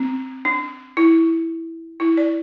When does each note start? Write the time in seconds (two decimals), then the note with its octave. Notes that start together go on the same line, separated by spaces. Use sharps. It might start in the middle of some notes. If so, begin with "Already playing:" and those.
Already playing: C4
0.45 D4
0.97 E4
2.00 E4
2.17 D5